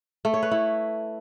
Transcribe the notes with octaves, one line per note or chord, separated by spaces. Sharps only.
A3
C#5
B4
E4